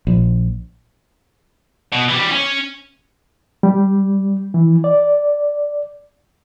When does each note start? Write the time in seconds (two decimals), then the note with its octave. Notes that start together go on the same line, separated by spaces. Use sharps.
0.07 A#1
1.92 B2
2.09 E3 G3
2.31 C#4 C#5
3.63 G3
4.54 E3
4.84 D5